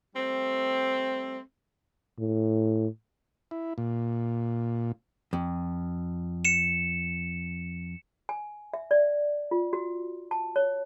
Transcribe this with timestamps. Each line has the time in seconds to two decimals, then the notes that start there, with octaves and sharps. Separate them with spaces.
0.15 G3 A3 C4
2.19 A2
3.51 E4
3.78 A#2
5.33 F2
6.45 C#7 E7
8.29 G#5
8.74 E5
8.91 D5
9.51 F4
9.73 F#4
10.31 A5
10.56 C#5